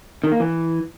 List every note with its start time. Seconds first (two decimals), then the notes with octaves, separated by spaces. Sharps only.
0.24 D#3
0.32 A#3
0.40 E3